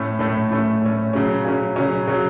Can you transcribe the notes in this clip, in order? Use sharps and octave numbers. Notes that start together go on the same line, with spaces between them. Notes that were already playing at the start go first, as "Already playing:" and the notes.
Already playing: A2 A3 C#4
A2 A3 C#4
A2 A3 C#4
A2 A3 C#4
C#3 F#3 C#4
C#3 F#3 C#4
C#3 F#3 C#4
C#3 F#3 C#4